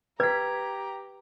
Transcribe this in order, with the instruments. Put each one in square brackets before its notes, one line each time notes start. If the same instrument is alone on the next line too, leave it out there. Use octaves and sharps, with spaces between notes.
[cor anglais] G4 [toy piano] B4 [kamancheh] A#5 [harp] G#6 B6